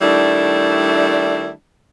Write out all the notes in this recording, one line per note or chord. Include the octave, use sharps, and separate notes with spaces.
D#3 G3 A3 D4 E4